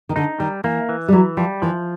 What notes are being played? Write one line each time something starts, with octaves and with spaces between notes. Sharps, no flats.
D#3
D3 D#4
D#3 G3
E3 A#3
E3
G3
E3 F#3
F3 G3
E3 F3